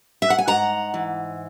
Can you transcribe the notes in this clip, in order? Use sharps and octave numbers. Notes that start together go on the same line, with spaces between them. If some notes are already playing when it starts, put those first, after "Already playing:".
E5
F#5
G#5
G#2 F#5 A#5
E3